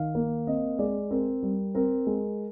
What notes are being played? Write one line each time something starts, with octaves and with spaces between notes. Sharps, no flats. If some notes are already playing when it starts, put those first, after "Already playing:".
Already playing: D#3 F5
A#3
C4 D#5
G#3 D5
C4 A#4
G3
C4 A#4
G#3